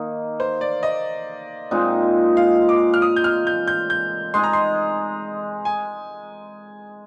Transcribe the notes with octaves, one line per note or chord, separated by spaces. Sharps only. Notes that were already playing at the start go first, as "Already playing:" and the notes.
Already playing: D#3 A#3 D#4
C5
D5
D#5
A#2 G#3 C4 D#4
F5
D6
F6
D#6
G6
F6
G6
G6
G6
G#3 D#4 G#4 C6
A#5
C6
G#5